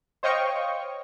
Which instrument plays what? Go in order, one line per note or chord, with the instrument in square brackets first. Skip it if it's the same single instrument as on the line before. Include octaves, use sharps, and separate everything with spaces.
[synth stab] C5 C#5 D#5 F5 G5 C#6